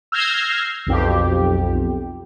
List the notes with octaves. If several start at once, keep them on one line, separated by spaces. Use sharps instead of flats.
E6 F6 G6 G#6 A#6 C7
B1 F2 G4